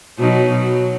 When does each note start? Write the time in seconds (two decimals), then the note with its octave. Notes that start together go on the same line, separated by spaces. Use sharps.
0.19 B2 F#3 D#4
0.57 F#3